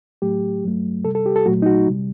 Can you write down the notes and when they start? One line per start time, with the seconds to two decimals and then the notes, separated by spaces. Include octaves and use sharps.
0.22 A2 F#3 A3 G4
0.64 G2 F#3 A3
1.05 C3 G3 A4
1.15 A4
1.26 G4
1.36 A4
1.46 A#2 F#3 A3 F#4
1.62 D#4
1.66 F#4
1.88 C3 G3